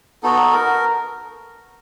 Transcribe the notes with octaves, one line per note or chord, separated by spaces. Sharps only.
B3 D#4 F#4 A4
A#4